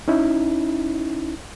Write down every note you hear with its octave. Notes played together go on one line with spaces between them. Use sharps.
C#4 D#4 E4